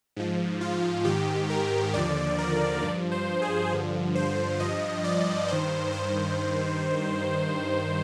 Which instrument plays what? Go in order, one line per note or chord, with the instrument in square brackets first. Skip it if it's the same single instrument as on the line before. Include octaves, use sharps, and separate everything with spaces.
[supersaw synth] G#2 F3
F4
G#2 D#3 G4
A#4
D#2 D3 F3 D5
A#4
G2 F3 D5
C5
G#4
G2 D3 F3
C5
G2 F3 D#5
D5
G2 D#3 C5
C5